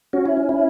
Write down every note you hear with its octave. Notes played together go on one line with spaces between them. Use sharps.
C#4 F#4
E4
E4